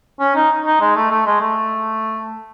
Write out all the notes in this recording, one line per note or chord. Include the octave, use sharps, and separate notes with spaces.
C#4
D#4
D#4
G#3
A3
A3
G#3
A3